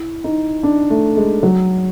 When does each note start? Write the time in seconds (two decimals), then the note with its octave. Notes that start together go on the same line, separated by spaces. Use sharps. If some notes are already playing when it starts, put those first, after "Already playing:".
Already playing: E4
0.24 D#4
0.63 D4
0.90 A3
1.17 G#3
1.43 F#3